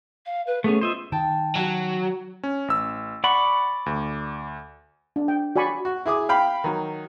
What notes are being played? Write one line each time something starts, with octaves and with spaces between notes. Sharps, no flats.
F5
B4
A3 B3 C#4 G#4
F4 C5 D#5 E5
D#3 G5 A5
F#3
C#4
A1 E6
D5 F#5 B5 C#6
D2
D4
G5
F#4 D5 G#5 B5 C#6
F#4
E4 G#4 D6 D#6
F5 G5 B5
D#3 F#3